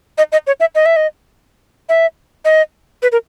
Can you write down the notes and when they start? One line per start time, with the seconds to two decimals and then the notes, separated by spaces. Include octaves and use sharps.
0.18 D#5
0.32 D#5
0.47 C#5
0.60 E5
0.75 D#5
0.86 E5
0.96 D#5
1.89 E5
2.45 D#5
3.02 B4
3.12 A#4